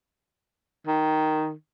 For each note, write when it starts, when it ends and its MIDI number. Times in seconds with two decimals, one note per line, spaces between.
0.87 1.52 51